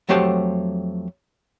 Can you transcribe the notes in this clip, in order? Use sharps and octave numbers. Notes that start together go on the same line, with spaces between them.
F2 F#3 A3 G4 C5 A5